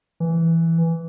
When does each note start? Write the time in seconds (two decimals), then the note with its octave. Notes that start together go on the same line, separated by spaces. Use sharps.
0.20 E3